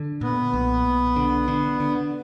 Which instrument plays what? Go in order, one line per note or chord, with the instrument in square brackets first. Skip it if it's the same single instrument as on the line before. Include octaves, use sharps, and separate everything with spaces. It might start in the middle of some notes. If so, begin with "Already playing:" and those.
Already playing: [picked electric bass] D3
[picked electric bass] A#2 [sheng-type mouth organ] B3
[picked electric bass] B1
B1
D3
D3
D3